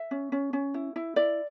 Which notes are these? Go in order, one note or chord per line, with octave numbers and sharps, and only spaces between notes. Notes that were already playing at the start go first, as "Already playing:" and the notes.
Already playing: E5
C#4
C#4
C#4
E4
E4
E4 D5